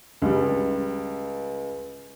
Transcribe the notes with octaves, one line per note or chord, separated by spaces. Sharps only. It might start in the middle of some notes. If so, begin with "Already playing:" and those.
C#2 G3